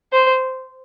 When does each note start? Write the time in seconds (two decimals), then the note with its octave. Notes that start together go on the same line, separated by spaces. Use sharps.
0.12 C5